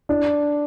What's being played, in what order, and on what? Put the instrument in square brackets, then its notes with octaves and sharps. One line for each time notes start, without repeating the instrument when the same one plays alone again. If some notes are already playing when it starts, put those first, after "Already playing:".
[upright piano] D4